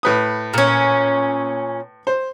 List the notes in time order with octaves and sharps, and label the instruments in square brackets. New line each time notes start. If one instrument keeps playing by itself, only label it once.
[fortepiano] A2 B4 D#6
[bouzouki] A#2 C#4
[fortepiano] C5